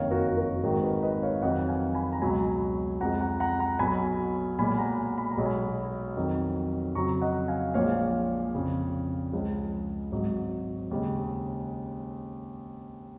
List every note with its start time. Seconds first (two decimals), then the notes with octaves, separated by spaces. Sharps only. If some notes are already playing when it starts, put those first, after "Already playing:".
Already playing: F#1 F2 D#3 C#5 F5
0.11 F#4 A#4
0.37 F#4 A#4
0.63 G#1 G#2 D#3 G#3 F#4 A#4
0.83 G#4 B4
1.03 B4 D#5
1.23 C#5 F5
1.42 F2 D#3 F#3 D#5 F#5
1.69 F5 G#5
1.95 G#5 B5
2.12 A#5
2.22 C#2 B2 F#3 G#5 B5
3.01 F2 F3 G#3 F#5 A#5
3.21 F#5 A#5
3.40 F#5 A#5
3.60 F#5 A#5
3.79 B1 B2 F#3 G#5 B5
4.58 B1 A#2 G#3 G#5 B5
4.69 G#5
4.78 F#5 A#5
5.18 B5
5.31 A#5
5.38 B1 B2 G#3
5.46 G#5 B5
6.17 F2 D#3 F#3
6.95 F2 C#3 F#3 A#5 C#6
7.22 D#5 F#5
7.48 F5 G#5
7.74 A#1 A#2 F3 G#3 C#5 F5
8.54 F2 C#3 F3
9.33 C#2 C#3 F3 G#3
10.12 G#1 G#2 F#3
10.91 D#2 C#3 G#3